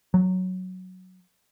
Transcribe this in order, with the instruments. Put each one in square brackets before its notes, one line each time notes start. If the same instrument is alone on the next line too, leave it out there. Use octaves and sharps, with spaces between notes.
[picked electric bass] F#3